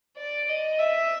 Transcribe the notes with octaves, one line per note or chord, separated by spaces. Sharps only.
D5
D#5
E5